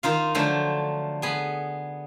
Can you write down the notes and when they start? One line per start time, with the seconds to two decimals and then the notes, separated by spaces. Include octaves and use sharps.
0.03 D#3 D#4 F4 F5
0.35 D3 F3 F#3 A3 C5
1.22 B3 G#4 B5